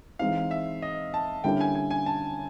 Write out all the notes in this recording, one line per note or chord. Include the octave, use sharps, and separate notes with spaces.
E3 G#3 C4 D#4 F5
E5
D#5
A5
D3 G3 A#3 C#4 E4 G5
G#5
G#5
G#5
A5